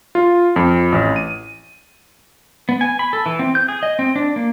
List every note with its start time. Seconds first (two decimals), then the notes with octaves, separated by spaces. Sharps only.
0.15 F4
0.56 F2
0.92 A1
1.16 D#7
2.69 B3
2.81 G#5
2.99 B5
3.13 A4
3.26 E3
3.39 C4
3.55 G6
3.68 G#4
3.83 D#5
3.99 C4
4.16 D4
4.36 A#3